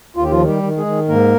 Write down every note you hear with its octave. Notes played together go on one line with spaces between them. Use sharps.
D#2 F4
G4
F3 F4
D#3
G3 G4
D#3
G#3 G#4
D#3
G#2 A#3 A#4